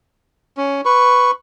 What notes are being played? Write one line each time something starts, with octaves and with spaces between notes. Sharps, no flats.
C#4
B4 C#6